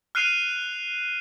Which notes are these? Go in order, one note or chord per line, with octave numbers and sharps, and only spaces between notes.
F6 F#6 C7 D#7 F7